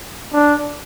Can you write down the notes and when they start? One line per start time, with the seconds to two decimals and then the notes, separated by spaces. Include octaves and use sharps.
0.33 D4